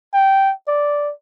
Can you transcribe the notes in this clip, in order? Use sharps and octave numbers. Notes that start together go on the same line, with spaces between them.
G5
D5